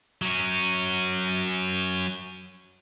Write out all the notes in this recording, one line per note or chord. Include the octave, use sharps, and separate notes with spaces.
F#3 C#4